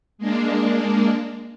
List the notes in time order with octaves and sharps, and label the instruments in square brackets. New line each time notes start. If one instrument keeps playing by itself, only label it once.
[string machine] G#3 A#3 D4